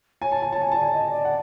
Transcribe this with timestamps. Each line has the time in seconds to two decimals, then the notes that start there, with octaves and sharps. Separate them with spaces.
0.22 C#5 G#5
0.32 A5
0.42 G#5
0.49 C#5 A5
0.62 G#5
0.72 D5 A5
0.82 G#5
0.93 D#5
1.10 D5
1.25 F#5